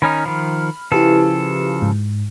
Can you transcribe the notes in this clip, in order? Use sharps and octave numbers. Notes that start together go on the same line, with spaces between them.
D#3 C#4 D#4 B5 F6
D#3 F3
C#3 F3 E4 G4 A4 B4
G#2